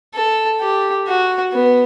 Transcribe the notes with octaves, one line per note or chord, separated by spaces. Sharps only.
A4
G4
F#4
B3